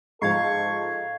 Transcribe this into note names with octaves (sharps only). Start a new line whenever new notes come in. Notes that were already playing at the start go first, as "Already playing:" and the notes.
G#2 F3 A4 F5 C#6 G#6 C7